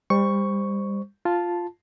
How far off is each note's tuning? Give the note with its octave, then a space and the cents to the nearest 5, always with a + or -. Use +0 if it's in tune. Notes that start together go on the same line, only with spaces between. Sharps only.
G3 +30 C5 +0 C#6 +5
F4 +0 A5 +0